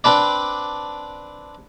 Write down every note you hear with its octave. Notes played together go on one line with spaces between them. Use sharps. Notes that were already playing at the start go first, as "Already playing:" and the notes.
C4 D4 B4 D5